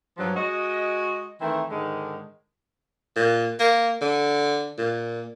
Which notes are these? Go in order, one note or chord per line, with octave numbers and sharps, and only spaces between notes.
G2 F3 F#3
G#3 F#4 D#5
D#3 E3 A3 C4 A#4
G#2 D3 D#3 G#3
A#2
A#3
D3
A#2